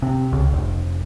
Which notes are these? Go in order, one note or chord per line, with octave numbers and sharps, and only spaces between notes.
C3
C#2
F1